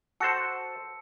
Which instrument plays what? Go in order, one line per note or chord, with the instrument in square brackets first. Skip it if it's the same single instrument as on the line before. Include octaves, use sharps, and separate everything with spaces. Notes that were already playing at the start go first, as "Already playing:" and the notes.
[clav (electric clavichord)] F#4 A4 C5 [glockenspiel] A5 E6 C#7